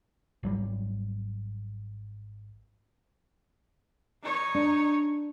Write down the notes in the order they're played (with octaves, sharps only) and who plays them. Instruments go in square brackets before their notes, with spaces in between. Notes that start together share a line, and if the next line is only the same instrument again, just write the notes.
[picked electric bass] G#1 F#3 G3
[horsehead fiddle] D#4 C#5
[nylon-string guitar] D4